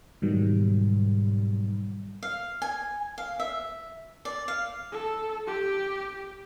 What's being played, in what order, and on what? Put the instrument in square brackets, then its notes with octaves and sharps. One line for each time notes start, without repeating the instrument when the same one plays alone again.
[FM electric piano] G#2 B2 D#3 F#3 G3
[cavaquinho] F5
G#5
F5
E5
D5
F5
[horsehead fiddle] A4
G4